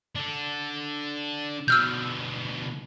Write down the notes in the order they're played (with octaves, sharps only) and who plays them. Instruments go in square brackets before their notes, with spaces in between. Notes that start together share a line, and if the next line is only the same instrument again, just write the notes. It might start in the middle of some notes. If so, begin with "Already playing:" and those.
[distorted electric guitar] D4 A4
[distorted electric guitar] B2 D3 [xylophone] E6 F6 G6